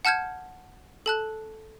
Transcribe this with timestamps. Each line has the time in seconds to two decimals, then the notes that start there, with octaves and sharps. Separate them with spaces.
0.05 F#5 A5 F6 G6 G#6
1.06 A4 A5 F#6